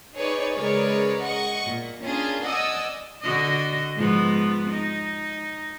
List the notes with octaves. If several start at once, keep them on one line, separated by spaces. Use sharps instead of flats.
D#4 G#4 B4 C#5 D5
C#3 G#3 A#4 B4 C#5 D5
D#5 F#5 C#6
A#2
A#3 C#4 D4 F4 G#4
D5 D#5 F#5 G#5 D#6 E6
D3 F#4 D#5
G#2 F3 B3
D#4